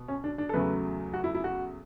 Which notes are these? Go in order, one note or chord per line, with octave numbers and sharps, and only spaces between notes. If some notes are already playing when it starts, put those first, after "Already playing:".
Already playing: B2
C#4
D4
D4
A4
E2 C#3 F#3 A3 B4
F#4
E4
E4
F#4